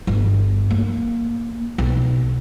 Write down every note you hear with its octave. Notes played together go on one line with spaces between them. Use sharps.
G1
A#3
B1